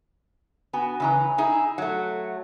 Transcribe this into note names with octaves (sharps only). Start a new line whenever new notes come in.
B3 F#4 G#5
C#3 E3 A#5
D#4 E4 G#4
F#3 A3 F#5